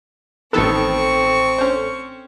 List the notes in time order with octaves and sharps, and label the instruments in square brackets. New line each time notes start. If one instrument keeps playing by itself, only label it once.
[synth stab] A1 A4 [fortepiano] D#3 B3 [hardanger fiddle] C4 C#6
[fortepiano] C#4 C5